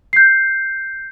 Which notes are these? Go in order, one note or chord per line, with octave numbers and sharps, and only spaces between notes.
G6 C7